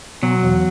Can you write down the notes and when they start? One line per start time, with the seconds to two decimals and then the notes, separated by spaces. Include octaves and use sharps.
0.23 B2 F#3
0.43 E2